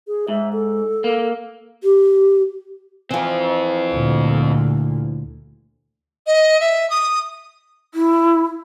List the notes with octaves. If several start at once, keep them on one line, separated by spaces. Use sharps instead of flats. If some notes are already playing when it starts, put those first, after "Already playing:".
G#4
G#2 E5
A4
A#3
G4
E3 F3 C4 F4
D2 A#2
D#5
E5
D#6
E4